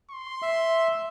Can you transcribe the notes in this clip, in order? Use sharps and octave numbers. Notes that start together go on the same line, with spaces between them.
C6
E5